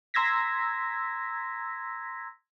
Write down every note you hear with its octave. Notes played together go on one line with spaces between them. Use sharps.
A#5 C6 E6 G#6 A#6 B6